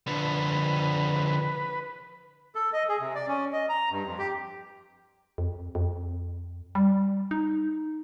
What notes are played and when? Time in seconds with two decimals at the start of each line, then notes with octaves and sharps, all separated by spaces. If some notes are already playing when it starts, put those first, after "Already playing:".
0.07 D3 F3 B4
2.55 A4
2.73 D#5
2.89 G#4
3.00 C3
3.15 D5
3.28 C#4
3.53 D#5
3.69 A#5
3.91 G2
4.06 F2
4.19 G4
5.38 F2
5.75 F2
6.75 G3
7.31 D#4